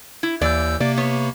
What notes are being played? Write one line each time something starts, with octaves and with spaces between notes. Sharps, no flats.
E4
D#2 E3 D5 E6 G6
C3 A#3 D5
B3 C#5